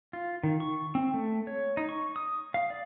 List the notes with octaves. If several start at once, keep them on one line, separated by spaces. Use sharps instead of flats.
F4
D#3
C#6
C4
A3
C#5
D#4
C#6
D#6
F5
D5